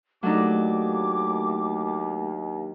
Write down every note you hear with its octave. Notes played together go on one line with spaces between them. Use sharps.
D#2 F#3 A3 D4 D#4 D6